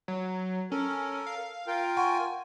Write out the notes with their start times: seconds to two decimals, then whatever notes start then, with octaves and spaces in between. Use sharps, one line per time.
0.08 F#3
0.72 C#4 A4 A#4
1.27 F5
1.67 F4 A#4 G5
1.97 F#5 G#5 C6 C#6